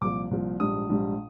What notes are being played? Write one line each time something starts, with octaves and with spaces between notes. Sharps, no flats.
C2 A#2 F3 D6
C2 A#2 F3
A#1 G#2 G3 D#6
A#1 G#2 G3